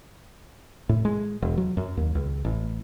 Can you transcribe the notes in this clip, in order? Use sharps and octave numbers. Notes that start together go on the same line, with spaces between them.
A2
G#3
E1
F#3
F#2
D#2
C#2
A1